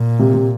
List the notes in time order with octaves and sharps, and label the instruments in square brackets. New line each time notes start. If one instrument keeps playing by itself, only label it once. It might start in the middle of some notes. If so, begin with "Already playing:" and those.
Already playing: [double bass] A#2
[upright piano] C3
C3